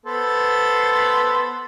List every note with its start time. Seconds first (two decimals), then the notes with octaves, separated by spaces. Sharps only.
0.06 B3 A4 C5